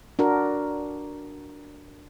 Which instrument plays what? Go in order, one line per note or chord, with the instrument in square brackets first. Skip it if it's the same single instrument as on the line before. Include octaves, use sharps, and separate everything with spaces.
[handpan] D4 F#4 A#4